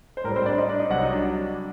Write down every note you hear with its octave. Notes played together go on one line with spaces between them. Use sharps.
C5
A2 G3 A#4
C4 C5
D4 D5
D#4 D#5
D4 D5
D#4 D#5
C2 C3 F#3 F#4 F#5
D#4 D#5
D4 D5